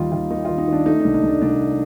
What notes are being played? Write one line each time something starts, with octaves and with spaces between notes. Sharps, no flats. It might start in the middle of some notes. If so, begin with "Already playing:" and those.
Already playing: D#2 G3 D#4 F4
D#2 F4
D#3 D#4
D#3 F4
D#4
D#3 D4
A3 D#4
C2 D4
D#4
C2
D4
C2 D4